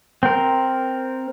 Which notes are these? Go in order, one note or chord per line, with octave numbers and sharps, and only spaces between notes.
C4 A#4